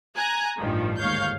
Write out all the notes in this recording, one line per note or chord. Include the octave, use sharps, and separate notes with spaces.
G#5 A#5 F#6
A1 G2 D#3 F3
G1 D#2 G#2 C#5 F5 G6